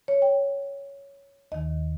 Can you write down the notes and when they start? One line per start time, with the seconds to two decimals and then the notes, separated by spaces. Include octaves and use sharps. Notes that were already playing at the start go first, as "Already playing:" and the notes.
0.08 C#5
0.22 G5
1.52 D#2 D#3 D#5